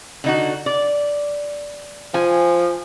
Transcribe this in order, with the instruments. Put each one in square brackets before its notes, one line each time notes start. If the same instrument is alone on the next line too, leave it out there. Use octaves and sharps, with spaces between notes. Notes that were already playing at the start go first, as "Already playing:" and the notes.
[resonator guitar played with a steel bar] D3 D#4 F#4
D5
[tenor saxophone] F3 [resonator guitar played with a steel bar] G#5